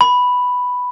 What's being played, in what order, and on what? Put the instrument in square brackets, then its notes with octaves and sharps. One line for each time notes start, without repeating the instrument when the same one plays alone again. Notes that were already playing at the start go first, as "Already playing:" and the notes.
[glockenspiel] B5